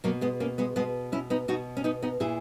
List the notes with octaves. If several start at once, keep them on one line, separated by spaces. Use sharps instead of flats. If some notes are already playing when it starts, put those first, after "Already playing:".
B2 F#3 A#3
G#3 B3
A#3 C#4
G#3 B3
B2 G#3 B3
C#4 E4
B3 D#4
B2 D#4 F#4
C#4
B3 D#4
B3 D#4
A#2 E4 G#4